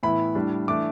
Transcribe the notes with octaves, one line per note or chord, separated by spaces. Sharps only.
A2 E3 B3 E4 B5
A2 G3 D4
E3 A3 D4 D6